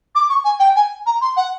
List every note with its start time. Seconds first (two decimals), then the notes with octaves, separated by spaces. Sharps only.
0.15 D6
0.30 C#6
0.44 G#5
0.60 G5
0.76 G#5
1.06 A#5
1.21 C6
1.37 F#5